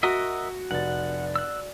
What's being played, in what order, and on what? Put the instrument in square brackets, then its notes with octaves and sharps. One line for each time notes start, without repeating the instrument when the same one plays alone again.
[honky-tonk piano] F#4 [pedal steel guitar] A#4 D#5 E5
[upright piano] F1 A6 [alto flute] D5 [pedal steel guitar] F#5
[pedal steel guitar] E6 F#6